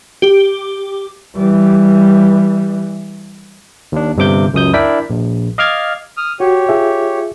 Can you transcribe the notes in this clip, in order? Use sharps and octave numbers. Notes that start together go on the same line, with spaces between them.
G4
E3 G3
D#2 D4
G1 G2 C3 D6 G6
C#2 F#2 D#6 G6
D4 E4 A#4 D5 G5 B6
A#1
D#5 F5 D6 F6 G#6 A6
D#6 F6
F#4 G4 C#5
F4 G#4 E5